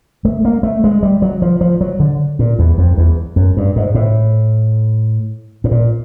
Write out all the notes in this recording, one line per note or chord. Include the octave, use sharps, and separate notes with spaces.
A3
A#3
A3
G#3
G3
F#3
F3
F3
F#3
D3
A#2
E2
F2
E2
F#2
G2
G#2
A2
A2
A#2